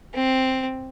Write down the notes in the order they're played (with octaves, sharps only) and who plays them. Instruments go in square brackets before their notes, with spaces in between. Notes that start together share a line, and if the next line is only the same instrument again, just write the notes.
[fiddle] C4